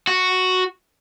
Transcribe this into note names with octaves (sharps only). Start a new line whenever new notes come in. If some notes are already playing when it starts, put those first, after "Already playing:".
F#4